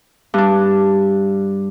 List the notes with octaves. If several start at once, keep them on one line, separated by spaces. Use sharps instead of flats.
G2 D4